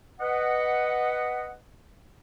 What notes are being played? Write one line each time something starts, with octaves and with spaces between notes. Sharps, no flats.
B4 D#5 F#5